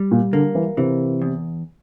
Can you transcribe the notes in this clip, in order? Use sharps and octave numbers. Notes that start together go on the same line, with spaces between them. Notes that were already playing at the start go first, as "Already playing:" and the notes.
Already playing: G3
A#2
D3 A#3
E3
C3 E3
E2